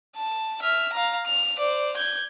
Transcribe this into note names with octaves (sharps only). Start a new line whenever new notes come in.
A5
E5 F6
F5 A#5
F7
C5 D5
G6 G#6